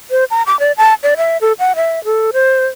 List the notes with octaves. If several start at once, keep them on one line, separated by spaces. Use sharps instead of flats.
C5
A#5
D6
D5
A5
D5
E5
A4
F#5
E5
A4
C5